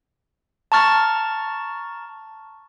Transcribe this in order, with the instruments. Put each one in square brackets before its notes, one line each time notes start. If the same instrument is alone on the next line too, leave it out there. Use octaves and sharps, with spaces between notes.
[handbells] A5 A#5 C#6 F6 A6